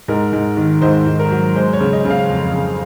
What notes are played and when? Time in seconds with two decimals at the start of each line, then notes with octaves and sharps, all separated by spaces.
0.08 G#2 A#4
0.33 G#2
0.57 D#3
0.82 G#2 C5
1.06 G#2
1.19 A#4
1.31 F#3
1.56 G#3 C5
1.73 C#5
1.80 C#3
1.93 D#5
2.05 C#3
2.10 F5
2.29 F2
2.53 C#3